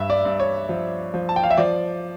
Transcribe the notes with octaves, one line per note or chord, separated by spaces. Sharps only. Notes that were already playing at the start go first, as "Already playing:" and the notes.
Already playing: G2 E5
D5
G2
C#5
F3
F3
A5
G5
F5
E5
F3 D5